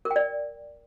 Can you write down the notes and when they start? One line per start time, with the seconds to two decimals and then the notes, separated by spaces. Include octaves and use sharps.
0.05 A#4
0.11 G5
0.16 D5